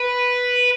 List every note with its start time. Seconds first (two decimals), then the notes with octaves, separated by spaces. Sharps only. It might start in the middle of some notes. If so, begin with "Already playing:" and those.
Already playing: B4